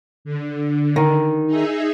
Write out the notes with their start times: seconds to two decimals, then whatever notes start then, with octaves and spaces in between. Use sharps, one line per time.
0.25 D3
0.96 D#3
1.47 D#4 G#4 E5